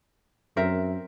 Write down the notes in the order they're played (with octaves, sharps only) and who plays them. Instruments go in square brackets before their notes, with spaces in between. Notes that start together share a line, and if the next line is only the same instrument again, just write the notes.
[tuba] F#2 [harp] C4 A#4 E5